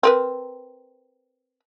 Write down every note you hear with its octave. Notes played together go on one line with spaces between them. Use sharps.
C4 A#4 B4